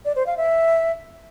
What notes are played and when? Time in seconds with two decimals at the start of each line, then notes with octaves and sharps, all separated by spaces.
0.05 D5
0.16 C5
0.26 F5
0.37 E5